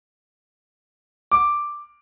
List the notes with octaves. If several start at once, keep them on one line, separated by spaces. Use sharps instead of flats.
D6